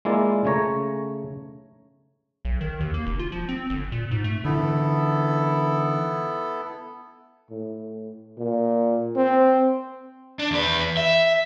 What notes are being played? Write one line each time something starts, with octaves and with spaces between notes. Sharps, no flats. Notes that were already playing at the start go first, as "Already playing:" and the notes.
G#3 A#3 E4 F4 D5
C#3 A3 C#5 A#5
B1
D#3
D#2
A#3
F1
F4
F3
C4
G1
A#2
G#2
A3
D3 E3 B3 E4 A4
A2
A#2
C4
D4
E2 B4
E5